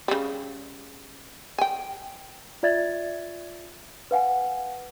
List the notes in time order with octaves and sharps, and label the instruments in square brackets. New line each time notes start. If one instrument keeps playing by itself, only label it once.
[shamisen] C#3 G3
G5 G#5
[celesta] F4 D5 E5 G#6 A6
B4 F5 F#5 G#5